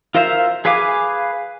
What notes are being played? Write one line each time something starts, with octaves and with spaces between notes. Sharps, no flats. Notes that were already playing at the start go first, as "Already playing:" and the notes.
F4 A#4 C5 E5 F5
G#4 B4 F5 G#5 D6